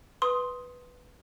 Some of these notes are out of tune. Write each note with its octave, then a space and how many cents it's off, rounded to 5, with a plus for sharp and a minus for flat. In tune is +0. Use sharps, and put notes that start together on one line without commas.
B4 +0 C6 +0 D#6 +10